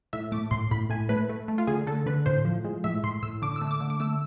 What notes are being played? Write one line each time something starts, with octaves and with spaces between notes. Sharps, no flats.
A2 E5
A3 D6
A2 C6
A2 B5
A2 G#5
A3 B4
A3
A3
F4
D3 G#4
D3 A4
D3 B4
A2 C5
F3
G#3
A2 E5
A2 C6
A2 E6
D3 D6
E6
A3
E6
D6
D3
D6
A3 E6